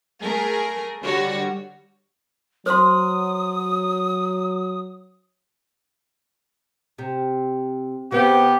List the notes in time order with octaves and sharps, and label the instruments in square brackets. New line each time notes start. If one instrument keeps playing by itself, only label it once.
[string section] A3 G#4 A#4 G#5
D3 G3 F#4 C#5
[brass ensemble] F#3 [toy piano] C5 C6 [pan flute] D#6
[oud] C3
[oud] C#3 C4 F4 [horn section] B3 G4